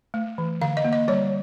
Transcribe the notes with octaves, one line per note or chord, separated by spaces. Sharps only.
A3
E3
D3 F5
D#5
A#3
D#5
G3 C#5